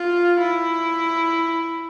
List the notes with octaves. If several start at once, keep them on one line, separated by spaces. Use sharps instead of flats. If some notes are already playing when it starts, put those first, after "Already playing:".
Already playing: F4
E4